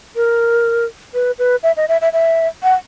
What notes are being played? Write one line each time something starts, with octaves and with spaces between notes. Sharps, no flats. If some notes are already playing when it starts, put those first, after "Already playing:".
A#4
B4
B4
E5
D#5
E5
E5
E5
F#5